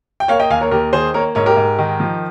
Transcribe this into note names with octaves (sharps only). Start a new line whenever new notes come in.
G5
A#3 C#5 F5
D#5 G5
D#2 F5 G#5
A#4 C#5
D#2 G4 A#4
D#3 G#4 C5
A#3 A#4 C#5
G#2 A#4 C#5
G4 A#4
G#2
D#3
F3